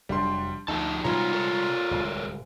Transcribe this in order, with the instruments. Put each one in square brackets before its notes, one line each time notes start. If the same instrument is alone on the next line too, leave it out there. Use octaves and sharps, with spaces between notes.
[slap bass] F1 F#3 [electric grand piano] G3 D4 C6
[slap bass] D2 [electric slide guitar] F3 G#4 A5 [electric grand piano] D#4
[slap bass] C3 G3 G#3 [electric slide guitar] D#4 B4 C#5 [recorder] F4 [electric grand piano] A#5
[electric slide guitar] A4 A#4 C#5
[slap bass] D1 C2 G#3